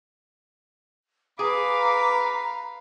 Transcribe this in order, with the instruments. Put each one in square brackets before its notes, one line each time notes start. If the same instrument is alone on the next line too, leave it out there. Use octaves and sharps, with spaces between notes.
[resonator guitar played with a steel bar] G#4 [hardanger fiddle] B4 F5 [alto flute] A#5 [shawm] D6